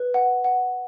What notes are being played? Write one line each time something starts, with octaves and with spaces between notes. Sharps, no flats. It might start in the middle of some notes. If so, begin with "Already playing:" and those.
Already playing: B4
F#5
F#5